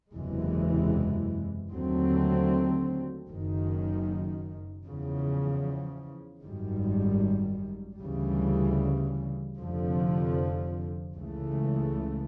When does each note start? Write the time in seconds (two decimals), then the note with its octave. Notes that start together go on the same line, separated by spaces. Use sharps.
0.13 F#1 E2 C3 E3 G#3
1.71 D#2 D3 F#3 A3 C4
3.28 F#1 F#2 D#3
4.86 E2 C#3 F3
6.42 G#1 F#2 D#3 G3
7.99 D2 C#3 E3 G3
9.56 F1 F2 D3 F3
11.14 C#2 C#3 E3 A3